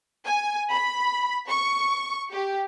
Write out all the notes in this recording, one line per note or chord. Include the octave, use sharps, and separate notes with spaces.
G#5
B5
C#6
G4